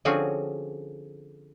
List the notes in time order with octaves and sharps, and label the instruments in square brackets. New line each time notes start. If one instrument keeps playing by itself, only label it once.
[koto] D3 F3 C4 C#4 F#4 G#4